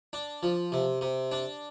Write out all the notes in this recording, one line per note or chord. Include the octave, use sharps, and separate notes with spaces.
D4
F3
C3
C3
D4